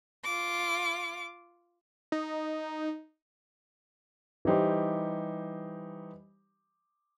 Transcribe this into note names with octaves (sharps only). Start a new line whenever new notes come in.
F4 D6
D#4
E3 G3 D#4 G4 C5